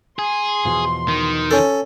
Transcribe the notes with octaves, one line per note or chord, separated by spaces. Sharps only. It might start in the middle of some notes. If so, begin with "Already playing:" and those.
G#4 C6
E2 B2 F3
D#3
C#4 A4